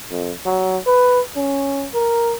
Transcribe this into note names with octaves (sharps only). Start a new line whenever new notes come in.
F2
F#3
B4
C#4
A#4